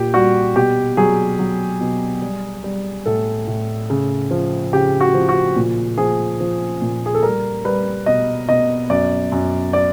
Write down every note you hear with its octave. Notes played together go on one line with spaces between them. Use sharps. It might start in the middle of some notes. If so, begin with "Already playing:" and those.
Already playing: A#2 G4
G3 F#4
B2 G4
F#3 G#4
F#3
B2
G3
G3
A2 A4
A2
C#3
F3
C#3 G4
F#4
F3
F#4
A#2
F3 G#4
F3
A#2
G#4
A4
G3 A#4
G3 B4
B2 D#5
B2 D#5
F#2 D5
F#2
D5